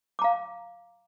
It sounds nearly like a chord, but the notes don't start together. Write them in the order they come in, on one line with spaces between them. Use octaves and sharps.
D6 A#5 F5